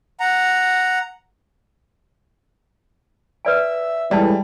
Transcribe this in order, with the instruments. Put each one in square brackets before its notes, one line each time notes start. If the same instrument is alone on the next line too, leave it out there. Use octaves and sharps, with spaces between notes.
[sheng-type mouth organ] F#5 A#5
[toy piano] B4 D5 G#5 [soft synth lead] E5
[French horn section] A2 E3 [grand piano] G3 [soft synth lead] G#3 [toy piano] D5 A5